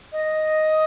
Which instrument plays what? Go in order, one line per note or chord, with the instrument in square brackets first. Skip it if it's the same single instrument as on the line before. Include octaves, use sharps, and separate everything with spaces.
[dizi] D#5